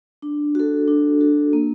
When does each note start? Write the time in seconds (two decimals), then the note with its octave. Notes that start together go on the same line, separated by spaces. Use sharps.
0.22 D4
0.55 F#4 A4
0.88 D4
1.21 F#4 A4
1.53 A#3